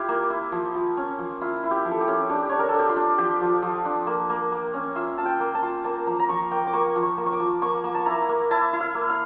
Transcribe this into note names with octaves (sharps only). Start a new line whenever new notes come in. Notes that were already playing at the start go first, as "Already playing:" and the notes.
Already playing: E4 F4 G4
A#3
E4
F3
F3
C#4
F3
E4 F4
E4
G4
F3
A4
G4
C#4
D4 G4
D4 C#5
A#4
A4
D4 G4
F4
D4
F3 G4
F3
F3
D4
A#3
A#3
A#3
C#4
F4 E5
F4 A5
G5
A#3
A5
F4
A#3 A5
F3 A#5
A#5
F3 C#6
A#3 G5
D6
A#3 C#6
F3
C#6
A#3
C#6
D6
F3
A#3 C#6
A#3
A5
E4 A#5
A#3
E4 A5
E4
F5
A#3
F5